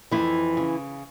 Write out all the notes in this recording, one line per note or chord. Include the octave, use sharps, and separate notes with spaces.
F2 E3 E4
C#3